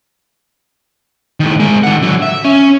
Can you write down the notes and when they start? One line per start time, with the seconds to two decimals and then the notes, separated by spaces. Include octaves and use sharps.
1.40 A2 D#3
1.60 G#3 A#4
1.83 D#3 F#5
2.02 D3 F#3
2.22 E5
2.44 C#4